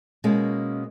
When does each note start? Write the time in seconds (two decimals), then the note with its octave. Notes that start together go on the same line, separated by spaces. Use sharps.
0.24 B2 G#3 A#3 C#4